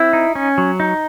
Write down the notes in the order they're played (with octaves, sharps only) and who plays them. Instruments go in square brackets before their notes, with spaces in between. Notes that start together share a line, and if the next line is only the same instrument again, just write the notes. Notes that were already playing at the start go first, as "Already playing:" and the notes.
Already playing: [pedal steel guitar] C4 E4
D#4
C#4
F#3
D#4